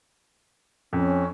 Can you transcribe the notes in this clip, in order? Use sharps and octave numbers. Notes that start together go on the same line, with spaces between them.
F2 C#4